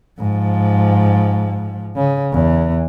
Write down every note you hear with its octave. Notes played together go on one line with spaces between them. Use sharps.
G#2 F3
C#3
E2